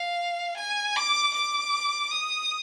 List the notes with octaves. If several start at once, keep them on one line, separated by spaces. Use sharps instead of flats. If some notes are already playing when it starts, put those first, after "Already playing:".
Already playing: F5
G#5
D6
D6
D#6